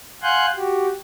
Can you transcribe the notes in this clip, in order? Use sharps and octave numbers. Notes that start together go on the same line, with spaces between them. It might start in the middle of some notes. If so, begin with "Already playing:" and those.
F5 F#5 G#5 C6 F#6 G6
F#4 G4